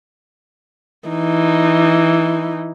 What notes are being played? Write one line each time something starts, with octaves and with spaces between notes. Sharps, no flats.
E3 D#4